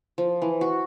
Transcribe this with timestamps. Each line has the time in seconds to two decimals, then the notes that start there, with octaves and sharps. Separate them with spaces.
0.18 F3
0.42 E3
0.61 F#4